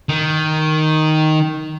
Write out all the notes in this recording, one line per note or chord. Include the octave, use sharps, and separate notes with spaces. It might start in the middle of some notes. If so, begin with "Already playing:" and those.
D#3